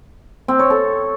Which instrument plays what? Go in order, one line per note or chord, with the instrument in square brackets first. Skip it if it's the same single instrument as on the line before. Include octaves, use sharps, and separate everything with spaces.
[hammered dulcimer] C4
C#5
A4